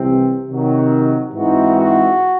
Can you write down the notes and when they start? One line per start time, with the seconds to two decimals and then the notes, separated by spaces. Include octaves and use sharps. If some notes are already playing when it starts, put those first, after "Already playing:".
Already playing: C2 C3 E3 C4
0.47 C3 D#3 F#3
1.33 G#2 E3 G#3 C4 D#4 F#4
1.76 F#4